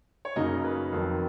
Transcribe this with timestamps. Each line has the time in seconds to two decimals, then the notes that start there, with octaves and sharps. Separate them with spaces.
0.25 C#5
0.36 F#2 C#3 F#3 A#3 D#4 D#5
0.64 B4
0.93 F2 D#3 F#3